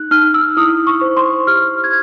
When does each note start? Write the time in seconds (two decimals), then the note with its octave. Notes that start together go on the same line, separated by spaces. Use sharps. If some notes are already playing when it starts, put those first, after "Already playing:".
Already playing: D#4 F#6
0.11 D#4 F6
0.34 E6
0.57 E4 D#6
0.87 C#6
1.01 C5
1.17 C6
1.47 G4 F6
1.84 G#6